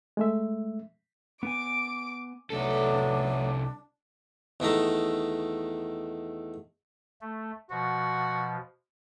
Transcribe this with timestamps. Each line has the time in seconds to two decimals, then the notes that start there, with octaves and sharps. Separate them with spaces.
0.17 G#3 A3 E5
1.43 B3 G#5 D6 D7
2.50 C2 F#3 A3 B3 D4 A4
4.60 E2 D#3 A3 A#5
7.21 A3
7.71 B2 F3 F#4